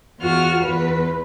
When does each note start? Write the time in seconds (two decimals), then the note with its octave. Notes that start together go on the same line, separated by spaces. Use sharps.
0.19 E2 F4 F#4 F6
0.62 E2 B4